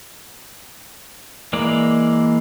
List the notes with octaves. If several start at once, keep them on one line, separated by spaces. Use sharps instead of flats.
E3 G#3 A#3 D5